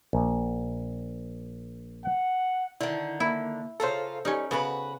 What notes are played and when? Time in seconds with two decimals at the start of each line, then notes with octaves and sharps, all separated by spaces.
0.13 A#1
2.05 F#5
2.81 D3 D#3 E4
3.20 A#3 E4
3.80 C#3 F4 A4 C5 A#5
4.25 G3 C#4 D#4
4.51 C#3 B3 F#4 B4